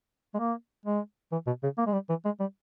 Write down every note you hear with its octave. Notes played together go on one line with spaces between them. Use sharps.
G#3
A#3
G#3
E3
B2
C#3
A#3
G#3
G3
E3
G#3
G3